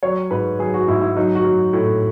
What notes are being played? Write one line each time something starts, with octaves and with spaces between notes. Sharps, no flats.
F#3 C#5
G#2 B4
F#3 G#4
F#4
G#2 E4
E4
F#3 D#4
F#4
F#3
A2